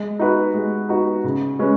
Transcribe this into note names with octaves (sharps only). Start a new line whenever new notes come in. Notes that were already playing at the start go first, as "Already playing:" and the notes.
Already playing: G#3
D#4 F#4 B4
G#3
D#4 F#4 B4
C#3
G#3 C#4 B4